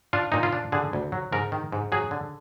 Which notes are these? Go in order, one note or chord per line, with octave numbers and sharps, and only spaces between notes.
D4 F4
A#2 D#4
F4
D4
D3 G#4
D2
F#3
G#2 A#4
D#3
G#2
F#3 G#4
D3